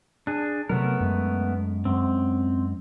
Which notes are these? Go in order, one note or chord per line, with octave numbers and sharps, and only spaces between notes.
D4 G#4
C3 F#3 A3 B3 A#4
F#2 G#3
F#2 G#3 C4